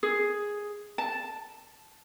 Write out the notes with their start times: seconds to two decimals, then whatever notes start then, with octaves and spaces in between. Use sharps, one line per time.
0.03 G#4
0.98 A5